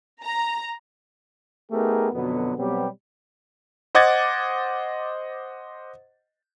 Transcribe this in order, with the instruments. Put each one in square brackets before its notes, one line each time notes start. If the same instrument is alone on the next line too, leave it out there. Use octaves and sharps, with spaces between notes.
[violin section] A#5
[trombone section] A3 B3 D#4 G4 G#4 A#4
F2 B2 D3 F#3 B3
B2 F#3 G3 B3 C4 G4
[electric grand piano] C5 D#5 F#5 D6 G#6 A6